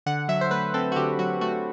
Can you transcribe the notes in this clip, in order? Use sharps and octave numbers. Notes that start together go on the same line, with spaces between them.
D3 F#5
F#3 E5
C5
A3 B4
C4 A4
F#4
D3 G4
F#3 F#4
A3 F#4